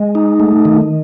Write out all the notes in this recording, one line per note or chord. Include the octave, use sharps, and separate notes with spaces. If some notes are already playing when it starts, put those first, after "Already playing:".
Already playing: G#3
D#4
A3
D#3